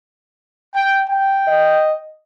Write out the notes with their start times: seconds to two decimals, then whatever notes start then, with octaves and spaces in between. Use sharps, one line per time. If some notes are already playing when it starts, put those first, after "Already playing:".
0.75 G5
1.09 G5
1.48 D#5